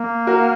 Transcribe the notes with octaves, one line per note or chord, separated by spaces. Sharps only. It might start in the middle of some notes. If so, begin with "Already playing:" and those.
Already playing: A#3
F#4 A#4